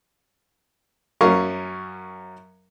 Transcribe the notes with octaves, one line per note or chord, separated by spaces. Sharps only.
F#2 C#4 A#4 F5 C#6